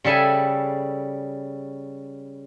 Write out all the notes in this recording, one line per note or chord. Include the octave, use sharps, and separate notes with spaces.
C#3 G3 A4 E5 G#5